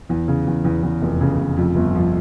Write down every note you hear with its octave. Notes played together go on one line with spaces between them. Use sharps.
E2
C#3
E2
E2
E2
F1
C#3
F1
F2
G1
F3